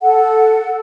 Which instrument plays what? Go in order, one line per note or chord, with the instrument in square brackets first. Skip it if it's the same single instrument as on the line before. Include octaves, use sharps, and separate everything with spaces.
[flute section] A4 F#5